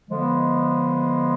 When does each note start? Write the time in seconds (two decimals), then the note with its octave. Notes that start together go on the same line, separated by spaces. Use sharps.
0.08 D3 F3 G#3 B3